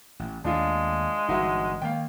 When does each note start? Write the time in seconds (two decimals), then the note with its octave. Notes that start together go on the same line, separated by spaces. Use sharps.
0.19 A1
0.44 D#2 G#3 A3 D4 F4
1.28 G1 E3 D#4 F#4 E5
1.82 D#3 A#3 F5 G5